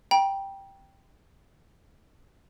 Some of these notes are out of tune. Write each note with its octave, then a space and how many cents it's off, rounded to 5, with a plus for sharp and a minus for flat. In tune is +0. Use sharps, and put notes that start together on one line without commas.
G5 +0 A#5 +45